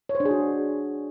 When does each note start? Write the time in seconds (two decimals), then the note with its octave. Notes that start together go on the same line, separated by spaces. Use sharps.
0.09 C#5
0.15 C5
0.20 D4
0.25 G#4
0.31 F#4